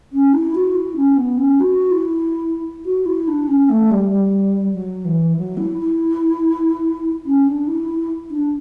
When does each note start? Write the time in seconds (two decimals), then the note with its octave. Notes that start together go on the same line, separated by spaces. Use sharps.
0.13 C#4
0.33 E4
0.55 F#4
0.75 E4
0.96 C#4
1.17 B3
1.38 C#4
1.60 F#4
1.91 E4
2.86 F#4
3.06 E4
3.28 D4
3.48 C#4
3.69 A3
3.91 G3
4.11 G3
4.74 F#3
5.05 E3
5.37 F#3
5.57 E4
5.79 E4
7.26 C#4
7.47 D4
7.68 E4
7.89 E4
8.31 D4